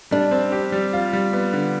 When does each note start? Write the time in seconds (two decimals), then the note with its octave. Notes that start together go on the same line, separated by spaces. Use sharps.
0.11 G3 D4
0.31 C4
0.52 G4
0.72 G3
0.93 F4
1.13 G3
1.33 B3
1.53 D3